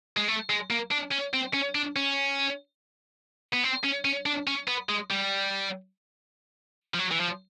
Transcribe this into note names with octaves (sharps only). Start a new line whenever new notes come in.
G#3
A3
G#3
A#3
D4
C#4
C4
C#4
D4
C#4
B3
C4
C#4
C#4
D4
C#4
B3
G#3
G3
F3
F#3
E3
F3